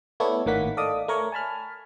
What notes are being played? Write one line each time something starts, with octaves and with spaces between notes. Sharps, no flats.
A3 B3 E4 A4 C#5 D5
G#1 A2 D#3 A#3 F#5 B6
A4 D5 D#5 F5 D6 D#6
A3 A#4 C#5 C#6
G#5 A5 B5 F6